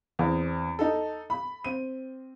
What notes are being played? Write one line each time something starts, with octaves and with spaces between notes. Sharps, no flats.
E2 C4
D#4 A4
B5
C4 D#7